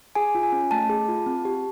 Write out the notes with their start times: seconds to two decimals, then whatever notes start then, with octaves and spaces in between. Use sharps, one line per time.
0.15 G#4 G#5
0.35 F4
0.43 G#5
0.52 C#4
0.71 A3 A5
0.89 G#4
1.09 F4
1.26 C4
1.45 G4